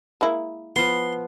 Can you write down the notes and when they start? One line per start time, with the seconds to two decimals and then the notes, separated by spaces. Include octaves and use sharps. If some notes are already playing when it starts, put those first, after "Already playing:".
0.21 G#3 A#3 E4
0.76 F3 B3 C6